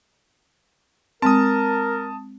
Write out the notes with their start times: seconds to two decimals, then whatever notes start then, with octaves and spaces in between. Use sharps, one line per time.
1.22 G#3 C4 A#4 A5 D#6